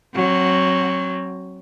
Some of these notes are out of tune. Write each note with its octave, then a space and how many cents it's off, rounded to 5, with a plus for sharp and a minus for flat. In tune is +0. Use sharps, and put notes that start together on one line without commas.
F#3 +0 C4 +30